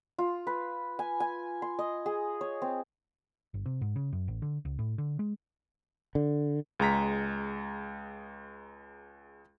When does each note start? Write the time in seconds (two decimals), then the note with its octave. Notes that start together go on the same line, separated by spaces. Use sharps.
0.18 F4
0.47 B4
0.99 G#5
1.20 G#5
1.62 C6
1.79 D#5
2.06 G#4
2.41 C#5
2.62 C4
3.54 G1
3.66 C3
3.81 G#2
3.96 C#3
4.13 F#2
4.28 A1
4.42 D3
4.65 C#2
4.79 A2
4.98 D3
5.19 G#3
6.15 D3
6.79 C#2 G#3 A#5 B6